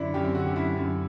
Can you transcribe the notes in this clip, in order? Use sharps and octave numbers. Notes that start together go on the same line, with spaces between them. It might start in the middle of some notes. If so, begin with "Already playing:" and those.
Already playing: F#2 D3 D4 E4
F#2 G4
C4
D3 F#4
G4
F#2 E4
F#2